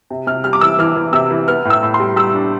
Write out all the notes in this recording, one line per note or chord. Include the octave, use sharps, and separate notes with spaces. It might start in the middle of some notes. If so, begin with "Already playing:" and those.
C3
C3 F6
G3 F6
D6
E3 E6
E3 F6
E3
C3 E6
E3
B3 F6
A2
E6
A2
C6
G3
G3 E6
D4